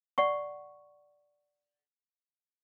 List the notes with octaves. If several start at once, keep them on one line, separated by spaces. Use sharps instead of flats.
D5 F#5 C#6